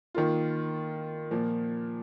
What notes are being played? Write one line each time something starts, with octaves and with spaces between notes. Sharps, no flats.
D#3 A#3 F4
A#2 F3 A#3